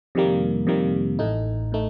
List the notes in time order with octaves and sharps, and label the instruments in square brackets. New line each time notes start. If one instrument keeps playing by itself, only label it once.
[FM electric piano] F2 C3 D#3 G3 A#3
F2 C3 D#3 G3 A#3
A1 A2 A3 D#4
A2 A3 D#4